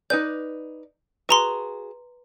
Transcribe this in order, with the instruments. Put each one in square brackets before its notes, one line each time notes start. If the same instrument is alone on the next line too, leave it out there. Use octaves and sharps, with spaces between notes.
[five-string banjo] D#4 B4 D5 [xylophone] G6
[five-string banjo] F#4 G#4 [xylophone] B4 A#5 C6